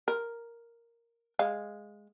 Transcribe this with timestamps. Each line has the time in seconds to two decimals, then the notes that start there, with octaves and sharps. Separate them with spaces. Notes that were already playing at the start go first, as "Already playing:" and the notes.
0.08 A#4
1.39 G#3 F5